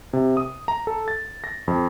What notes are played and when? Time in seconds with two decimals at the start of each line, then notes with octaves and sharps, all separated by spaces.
0.13 C3
0.37 D#6
0.68 A#5
0.87 A4
1.08 A6
1.44 A#6
1.68 F2